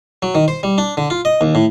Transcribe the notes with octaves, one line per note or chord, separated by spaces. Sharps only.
F#3
D#3
C5
G3
D4
D3
F4
D#5
D#2
A2